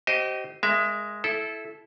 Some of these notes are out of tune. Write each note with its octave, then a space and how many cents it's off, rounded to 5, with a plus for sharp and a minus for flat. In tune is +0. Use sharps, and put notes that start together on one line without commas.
G4 -35 C5 +0 D#5 +0
G#3 +0 A#4 +0 E5 +25
E4 -5 A4 -20